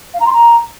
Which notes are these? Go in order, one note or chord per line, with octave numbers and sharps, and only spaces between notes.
F5
A#5
C6
A#5